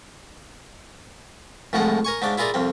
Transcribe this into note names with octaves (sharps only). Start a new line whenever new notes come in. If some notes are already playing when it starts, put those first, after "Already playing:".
C2 A2 F3 G#3 F#5
A#4 G#5 C#6
G#2 C#3 D4 D6
E4 F4 G#4 A#4 D5
C2 F2 C4